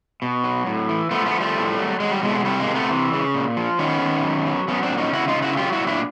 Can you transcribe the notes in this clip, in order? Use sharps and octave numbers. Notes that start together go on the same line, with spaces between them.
B2
F#3
A2
E3
F3 A3 B3
A3 B3
F3
G3 A3
A2
F#3
F#3 G#3
G3
B2 G#3
A3
G#3
C3 G3 A3
G#3 A#3
C3
A3 B3
E3
C#3
A#2
F3
D#3 B3 C#4
D#3
F#3
F#3
F#3 B3 C#4
C4 D4
A#2
C#4 D#4
C#3 E4 F#4
D#4 F4
C#3
E4 F#4
F#4
F#3 F4 G4
E4 F#4
A#2
D4 E4